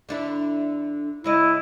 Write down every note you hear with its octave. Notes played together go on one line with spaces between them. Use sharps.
D3 D4 E4
C#3 G#3 E4 D#5